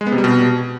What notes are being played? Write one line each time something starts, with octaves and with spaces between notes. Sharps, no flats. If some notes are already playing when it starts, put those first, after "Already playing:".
G#3
B3
C3
G3
B2